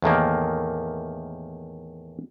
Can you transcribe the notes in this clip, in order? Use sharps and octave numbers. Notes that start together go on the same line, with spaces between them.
E2 A2 D#3 A#3